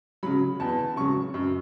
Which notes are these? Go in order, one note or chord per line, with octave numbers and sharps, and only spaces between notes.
C#3 F#3 B5
E2 A5
C#3 F#3 C#6
F#2